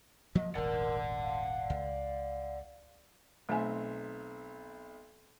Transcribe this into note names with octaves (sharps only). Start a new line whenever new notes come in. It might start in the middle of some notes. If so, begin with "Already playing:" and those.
F3 F#3 A#3 D#5
D#1 G#1 A#4 D5 F#5
F5
C#2
B1 A3 C4 E5 G#5